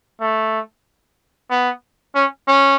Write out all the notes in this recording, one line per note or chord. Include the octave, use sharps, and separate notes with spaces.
A3
B3
C#4
C#4